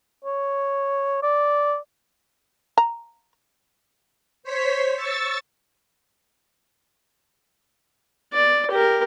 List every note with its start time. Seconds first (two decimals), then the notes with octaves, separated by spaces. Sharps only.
0.25 C#5
1.23 D5
2.78 A#5
4.43 C5 C#5 B6
4.95 C#6 E6 A6
8.33 D5
8.71 G4 A#4